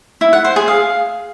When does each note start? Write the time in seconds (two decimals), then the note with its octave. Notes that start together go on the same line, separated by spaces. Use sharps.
0.21 E4
0.33 F#5
0.44 C5
0.56 G#4
0.68 F5